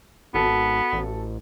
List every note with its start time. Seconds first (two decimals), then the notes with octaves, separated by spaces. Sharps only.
0.34 G#1 B3 F#4 A4
0.93 A1